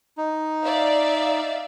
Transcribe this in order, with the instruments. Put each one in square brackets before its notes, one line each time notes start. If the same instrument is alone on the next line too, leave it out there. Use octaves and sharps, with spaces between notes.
[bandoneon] D#4
[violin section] D5 E5 F5